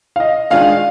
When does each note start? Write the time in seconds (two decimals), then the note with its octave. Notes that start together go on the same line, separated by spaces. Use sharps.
0.16 F5
0.20 D#5
0.50 D#3 G#3 D4 F4 G#4 F5